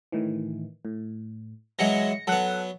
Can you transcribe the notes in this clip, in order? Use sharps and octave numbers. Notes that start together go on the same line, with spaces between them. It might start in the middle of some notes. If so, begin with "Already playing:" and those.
A2 D#3 E3
A2
E3 F#3 G#3 A#6 C#7
F#3 B3 A4 F#5